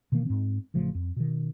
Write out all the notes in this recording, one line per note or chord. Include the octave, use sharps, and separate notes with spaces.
B2 D#3 E3 A#3
G#2 C4
A1 C#3 F3 A3
F2
B2 D#3